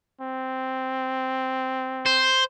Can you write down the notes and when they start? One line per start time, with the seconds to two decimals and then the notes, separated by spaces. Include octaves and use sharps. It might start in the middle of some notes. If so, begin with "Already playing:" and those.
0.21 C4
2.06 C5